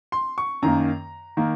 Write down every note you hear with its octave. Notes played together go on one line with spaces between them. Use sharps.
C6
C#6
F#2 D#3 A#3 A#5
D#3 A#3